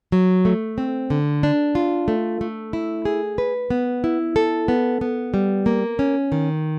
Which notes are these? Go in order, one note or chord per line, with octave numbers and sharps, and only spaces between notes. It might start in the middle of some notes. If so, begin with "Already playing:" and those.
F#3
A3
C4
D3
D4
F4
A3
A3
E4
G#4
B4
B3
E4
A4
B3
B3
G3
A#3
C#4
D#3